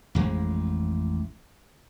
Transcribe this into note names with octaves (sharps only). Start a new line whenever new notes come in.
A1 F2 G#3